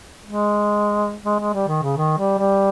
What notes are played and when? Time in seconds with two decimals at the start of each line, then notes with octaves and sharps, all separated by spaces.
0.26 G#3
1.26 G#3
1.40 G#3
1.54 G3
1.68 D#3
1.82 C#3
1.97 D#3
2.18 G3
2.39 G3